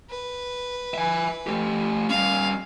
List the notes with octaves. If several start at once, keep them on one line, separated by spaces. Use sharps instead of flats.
B4
E5 G#5
A3 G4
G3 C#4 F5